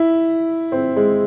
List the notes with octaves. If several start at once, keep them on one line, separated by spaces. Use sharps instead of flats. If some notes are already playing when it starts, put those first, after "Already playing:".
Already playing: E4
C4
G#3